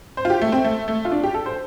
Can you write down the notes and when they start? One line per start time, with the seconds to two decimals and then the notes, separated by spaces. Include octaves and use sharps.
0.17 C5
0.25 F4
0.30 G4
0.42 A3
0.52 C4
0.64 A3
0.88 A3
1.05 F4
1.12 D4
1.23 G4
1.34 A4
1.46 C5